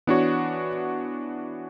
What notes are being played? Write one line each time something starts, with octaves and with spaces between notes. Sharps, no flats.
E3 B3 D4 F#4 C#5